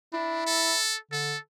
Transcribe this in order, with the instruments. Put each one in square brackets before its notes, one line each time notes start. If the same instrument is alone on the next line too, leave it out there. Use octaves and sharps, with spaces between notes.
[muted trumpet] D4 [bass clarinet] E4
[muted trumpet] A4
[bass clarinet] D3 [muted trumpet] A4